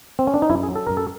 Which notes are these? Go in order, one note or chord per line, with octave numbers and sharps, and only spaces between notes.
C4
C#4
D4
D#4
F#2 E4
G#4
F#3
A4
F#2 A#4
A4